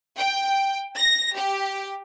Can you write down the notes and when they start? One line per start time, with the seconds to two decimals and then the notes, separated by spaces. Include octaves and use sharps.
0.18 G5
0.97 A#6
1.37 G4